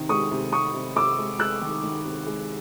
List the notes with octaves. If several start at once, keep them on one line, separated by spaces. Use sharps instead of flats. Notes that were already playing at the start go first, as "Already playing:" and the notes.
Already playing: C3 D#3
G#3 C#6 D#6
C3
C3 C#6 D#6
C3
C3 D6 E6
G#3
G#3 E6 F#6
D#3
D#3
C3
G#3